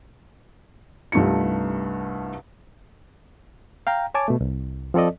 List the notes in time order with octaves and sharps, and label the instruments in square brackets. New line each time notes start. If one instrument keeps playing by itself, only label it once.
[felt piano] C2 G2 A3 D#4 F4 C#7
[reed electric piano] F5 G5 A#5
C#5 G#5 A5 D6
B2 A3
C2
F3 C4 A4 D5 D#5